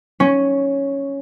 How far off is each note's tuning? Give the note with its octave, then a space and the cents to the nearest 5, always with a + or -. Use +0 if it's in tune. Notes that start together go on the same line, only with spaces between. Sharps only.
C#4 +0